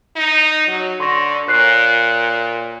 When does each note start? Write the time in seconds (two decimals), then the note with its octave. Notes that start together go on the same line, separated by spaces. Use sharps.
0.16 D#4
0.68 F#3
1.00 D3 C6 C#6 A#6
1.48 A#2 C#5 F#6 C7